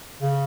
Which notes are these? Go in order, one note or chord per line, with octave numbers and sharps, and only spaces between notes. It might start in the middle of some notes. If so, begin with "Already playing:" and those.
C#3